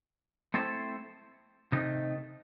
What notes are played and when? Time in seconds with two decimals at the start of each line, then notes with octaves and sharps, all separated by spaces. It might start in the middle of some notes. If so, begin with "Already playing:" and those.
0.54 A3 C4 E4 A4 C5
1.72 C3 D#3 A3 D#4